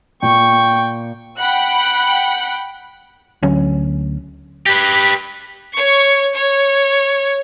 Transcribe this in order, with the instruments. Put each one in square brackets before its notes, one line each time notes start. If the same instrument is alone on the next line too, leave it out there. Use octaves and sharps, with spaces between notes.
[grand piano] A#2 [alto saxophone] G5 [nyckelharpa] C#6
[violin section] F#5 G5 B5 F#6
[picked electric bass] D2 F#3 C#4
[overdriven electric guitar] G4 B4
[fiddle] C#5 C#6
C#5